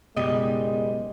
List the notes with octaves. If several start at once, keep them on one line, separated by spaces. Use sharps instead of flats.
F#1 B2 G3 G#3 D#5